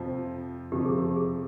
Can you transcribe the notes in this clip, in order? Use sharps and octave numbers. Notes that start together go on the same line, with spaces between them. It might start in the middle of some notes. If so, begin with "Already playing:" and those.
Already playing: F2 C3 F3 F4
F2 C3 F3 G4
G#4
G4
G#4